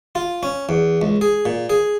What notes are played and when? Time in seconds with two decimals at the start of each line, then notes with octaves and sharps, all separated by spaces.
0.15 F4
0.43 C#4
0.69 E2
1.02 C#2
1.21 G#4
1.45 A#2
1.70 G#4